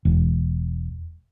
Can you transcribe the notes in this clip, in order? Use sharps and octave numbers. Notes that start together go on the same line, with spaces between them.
E1